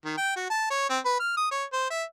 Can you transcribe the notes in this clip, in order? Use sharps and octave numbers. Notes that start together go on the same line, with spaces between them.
D#3
G5
F#4
A5
C#5
C4
B4
F6
D#6
C#5
C5
E5